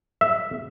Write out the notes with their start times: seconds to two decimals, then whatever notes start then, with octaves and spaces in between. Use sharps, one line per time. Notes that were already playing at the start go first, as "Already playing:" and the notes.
0.21 E5